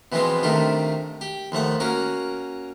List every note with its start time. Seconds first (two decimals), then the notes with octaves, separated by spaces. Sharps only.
0.12 B2 E3 F3 G#3 B3 C4
0.43 C3 D#3 A3 D4 F4
1.21 G4
1.52 D#2 F3 A3 F#5
1.80 A#3 C#4 F#4 A#4